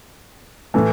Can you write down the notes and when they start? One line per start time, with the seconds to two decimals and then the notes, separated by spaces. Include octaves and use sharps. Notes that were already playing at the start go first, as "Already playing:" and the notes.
0.74 A2 E3 A3